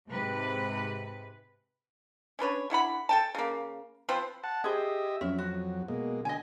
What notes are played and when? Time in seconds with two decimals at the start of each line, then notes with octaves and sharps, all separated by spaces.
0.11 G#2 C3 B4
2.39 C#4 D4 B4 C#5
2.70 D3 E4 F#5 B5
3.09 A4 G5 A5
3.35 C#3 A#3
4.09 F3 C4 B4 C5
4.44 F#5 A5
4.64 G4 G#4 C5 D#5 E5
5.21 F2 F#3 C#4 E5
5.38 F#4
5.88 B2 G#3 A#3
6.25 D3 D#5 G#5